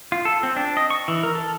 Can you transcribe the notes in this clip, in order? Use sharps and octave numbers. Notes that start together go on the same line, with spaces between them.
F4
A4
C4
D4
D#5
C#6
E3
A#4
A4